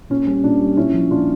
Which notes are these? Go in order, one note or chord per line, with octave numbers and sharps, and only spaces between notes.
A#2 C#4
G3 C#4
A#2 D4
G3
A#2 C#4 E4
F3
A#2 D4 F4